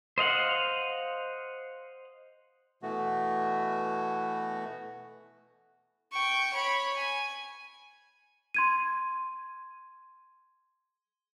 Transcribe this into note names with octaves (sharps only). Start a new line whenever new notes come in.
C5 D#5 F5 F#5
B2 E3 A3 B3 F#4
G5 C#6
C#5 B5
G#5
C6 G#6 D#7